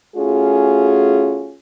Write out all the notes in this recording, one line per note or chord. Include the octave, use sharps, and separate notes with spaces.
A3 C#4 F4 F#4 G#4